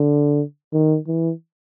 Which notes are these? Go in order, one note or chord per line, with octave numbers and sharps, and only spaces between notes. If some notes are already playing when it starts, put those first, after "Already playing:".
Already playing: D3
D#3
E3